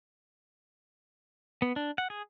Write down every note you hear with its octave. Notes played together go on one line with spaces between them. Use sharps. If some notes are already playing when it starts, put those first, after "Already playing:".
B3
D4
F#5
G#4